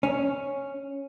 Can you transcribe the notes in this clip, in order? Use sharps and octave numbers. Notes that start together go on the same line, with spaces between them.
C#4